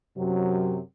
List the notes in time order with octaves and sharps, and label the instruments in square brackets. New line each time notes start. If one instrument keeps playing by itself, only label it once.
[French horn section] F#2 C3 F#3